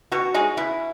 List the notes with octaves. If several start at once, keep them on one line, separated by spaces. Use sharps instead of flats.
B2 F#4
G#3 D#4 G#4
B2 E4